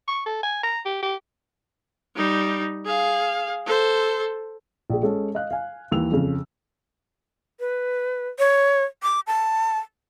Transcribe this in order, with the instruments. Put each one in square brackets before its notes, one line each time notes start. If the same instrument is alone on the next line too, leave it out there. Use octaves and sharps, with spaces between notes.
[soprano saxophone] C#6
A4
G#5
A#5
G4
G4
[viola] G3 D#4
G#4 F5
A4 C5
[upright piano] A#1 G#4
G#3 C#4 A4
D#5 F5 F#6
F5 G#5
D#2 E3 E6 F7
F2 C#3 F3
[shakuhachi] B4
C#5
D6
A5